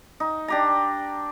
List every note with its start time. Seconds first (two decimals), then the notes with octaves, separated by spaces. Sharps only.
0.20 D#4
0.48 D4 G4 A#5